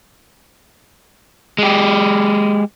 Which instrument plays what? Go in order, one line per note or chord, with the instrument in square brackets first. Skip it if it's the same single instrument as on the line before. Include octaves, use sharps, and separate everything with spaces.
[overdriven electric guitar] G#3 G4